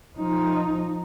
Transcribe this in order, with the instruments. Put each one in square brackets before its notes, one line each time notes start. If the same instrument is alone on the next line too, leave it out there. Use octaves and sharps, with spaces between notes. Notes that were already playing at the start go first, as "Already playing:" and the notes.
[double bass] F3 D#4